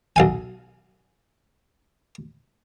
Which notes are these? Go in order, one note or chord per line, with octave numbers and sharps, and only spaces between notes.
B1 F5 G#5